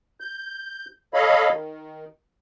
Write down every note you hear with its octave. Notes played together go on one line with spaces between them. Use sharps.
G6
A4 C#5 D#5 F5 B5
D#3